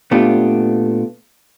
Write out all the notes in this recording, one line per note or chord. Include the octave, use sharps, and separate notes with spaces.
A#2 A3 B3 D4 F4 G4